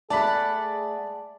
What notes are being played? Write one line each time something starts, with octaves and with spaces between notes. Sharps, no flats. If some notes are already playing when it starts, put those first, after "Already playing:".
A3 G#4 D5 F#5 A5 B5